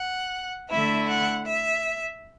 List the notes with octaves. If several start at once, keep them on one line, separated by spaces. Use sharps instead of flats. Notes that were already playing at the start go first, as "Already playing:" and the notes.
Already playing: F#5
D3 A3 E4 E5
F#5
E5